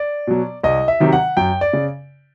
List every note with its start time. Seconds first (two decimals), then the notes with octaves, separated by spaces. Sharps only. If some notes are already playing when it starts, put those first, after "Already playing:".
Already playing: D5
0.27 B2 F#3
0.63 C2 D#5
0.88 E5
1.00 C3 D#3 F#3
1.12 F#5
1.37 F#2 G5
1.61 D5
1.73 C#3